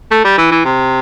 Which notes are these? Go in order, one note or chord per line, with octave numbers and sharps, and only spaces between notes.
A3
G3
E3
E3
C3